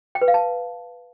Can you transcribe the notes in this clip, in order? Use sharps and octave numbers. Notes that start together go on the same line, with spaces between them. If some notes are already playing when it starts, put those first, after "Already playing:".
G5
B4
F5
A5